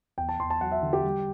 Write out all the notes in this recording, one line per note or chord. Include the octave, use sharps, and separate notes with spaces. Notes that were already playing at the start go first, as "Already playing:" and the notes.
E2 G5
A5
E2 C6
A5
F#3 F#5
E5
D3
G4
G3